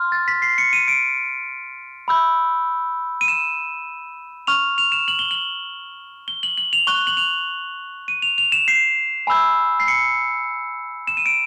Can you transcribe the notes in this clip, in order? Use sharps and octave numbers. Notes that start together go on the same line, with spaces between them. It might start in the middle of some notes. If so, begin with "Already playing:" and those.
Already playing: C6 F6
A6
B6
C7
C#7
D#7
D7
B5 E6 G6
D#7
E7
C#6 F6 F7
F7
E7
F#7
G7
F#7
G7
F#7
F#7
F7
C#6 F#6 G7
F#7
F7
D#7
F7
F7
E7
C7
G#5 B5 E6 G6
C7
C#7
E7
D#7
D7